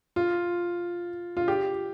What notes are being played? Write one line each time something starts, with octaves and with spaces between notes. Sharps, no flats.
F4
F4
G4